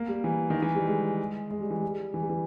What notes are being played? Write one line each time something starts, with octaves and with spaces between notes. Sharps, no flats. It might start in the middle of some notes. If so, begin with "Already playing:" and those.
Already playing: A#3
G3
E3
D#3
E3
G3
G#3
G#3
G3
E3
G3
E3
G3
E3